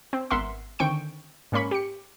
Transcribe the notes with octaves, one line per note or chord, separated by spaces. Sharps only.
C4
G#1 B3 A#4 E5 F#5 C6
D3 D#3 C4 G5 C#6 D7
G#2 A#3 C#4 B5 C#6
G4 C#7